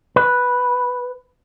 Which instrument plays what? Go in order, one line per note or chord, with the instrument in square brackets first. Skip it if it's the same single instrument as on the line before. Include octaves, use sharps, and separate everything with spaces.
[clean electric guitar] B4